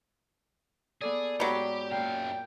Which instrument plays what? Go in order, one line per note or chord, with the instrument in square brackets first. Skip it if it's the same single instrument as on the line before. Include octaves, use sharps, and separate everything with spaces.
[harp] B3 A4 D5 [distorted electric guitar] G#4
[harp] G#2 B3 [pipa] F#3 G3 [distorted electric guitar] G4
[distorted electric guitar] F#2 F5 [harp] A#2 [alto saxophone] G5